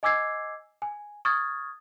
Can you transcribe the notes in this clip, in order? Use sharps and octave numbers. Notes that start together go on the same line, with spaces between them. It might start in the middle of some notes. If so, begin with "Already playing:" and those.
D#5 G#5 D6 E6 G#6 C7
G#5
C#6 D#6 F6 G#6 A6